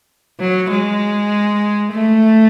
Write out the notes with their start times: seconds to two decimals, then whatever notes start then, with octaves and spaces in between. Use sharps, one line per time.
0.40 F#3
0.71 G#3
1.93 A3